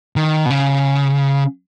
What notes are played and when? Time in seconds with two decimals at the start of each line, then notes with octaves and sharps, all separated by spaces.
0.16 D#3
0.46 B2
0.50 C#3